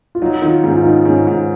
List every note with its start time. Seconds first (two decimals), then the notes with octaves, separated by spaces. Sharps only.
0.15 F4
0.22 F#3 D#4
0.42 D#3 F4
0.64 G#2 C#4
0.76 F4
0.84 D#3 D#4
1.05 G#2 C#4
1.27 G#2